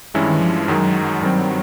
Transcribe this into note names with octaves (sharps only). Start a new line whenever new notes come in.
G2 D#3 E3 G#3 C#4 E4
F3
F#2 D#3 F#3 G#3
G2 D#3 G3 C4